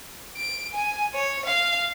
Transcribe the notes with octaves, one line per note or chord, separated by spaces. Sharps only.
D7
G#5
C#5
F5